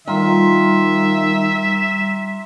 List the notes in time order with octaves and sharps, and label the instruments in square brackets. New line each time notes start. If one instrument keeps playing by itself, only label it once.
[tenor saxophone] D#3 [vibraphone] G3 A#5 [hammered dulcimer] F4 [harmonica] E5